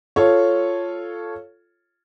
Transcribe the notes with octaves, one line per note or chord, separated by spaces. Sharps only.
F4 A4 C#5